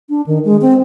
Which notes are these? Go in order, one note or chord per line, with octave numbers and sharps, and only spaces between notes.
D4
D#3
G#3
C4